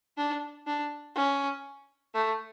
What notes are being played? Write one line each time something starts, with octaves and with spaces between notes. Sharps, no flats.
D4
D4
C#4
A3